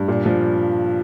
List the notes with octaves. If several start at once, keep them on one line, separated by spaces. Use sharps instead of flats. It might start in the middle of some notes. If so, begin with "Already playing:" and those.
Already playing: G2
A#2
F3